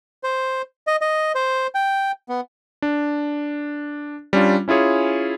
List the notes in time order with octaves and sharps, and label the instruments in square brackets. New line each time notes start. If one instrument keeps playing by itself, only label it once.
[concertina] C5
D#5
D#5
C5
G5
B3
[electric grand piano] D4
G3 C#4 D4 F4
C#4 E4 F4 G#4 C#5